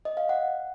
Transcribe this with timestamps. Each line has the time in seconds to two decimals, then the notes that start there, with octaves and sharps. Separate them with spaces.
0.05 D#5
0.17 F5
0.29 F#5